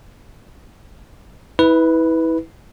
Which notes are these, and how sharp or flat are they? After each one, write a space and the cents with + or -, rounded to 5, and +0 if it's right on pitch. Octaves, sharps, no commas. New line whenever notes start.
E4 -30 B4 +0